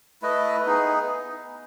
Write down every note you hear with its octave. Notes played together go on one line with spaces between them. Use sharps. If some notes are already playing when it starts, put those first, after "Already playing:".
A3 E4 B4 D#5
B3 D#4 G#4